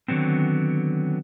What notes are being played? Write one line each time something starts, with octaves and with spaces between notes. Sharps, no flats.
D3 D#3 F#3 B3 C4